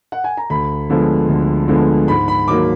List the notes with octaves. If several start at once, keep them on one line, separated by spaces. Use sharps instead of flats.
F#5
G#5
A#5
D2 B5
D3 F3 G#3 B3
D2
D3 F3 G#3 B3
G#2 B5
B5
D#3 F#3 A#3 D6